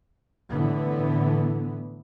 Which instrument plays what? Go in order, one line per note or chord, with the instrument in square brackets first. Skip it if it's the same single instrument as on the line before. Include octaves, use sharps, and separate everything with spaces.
[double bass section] A2 D3 E3 B3